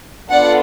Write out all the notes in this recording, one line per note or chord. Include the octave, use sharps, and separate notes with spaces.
B3 D4 F4 A4 D5 F#5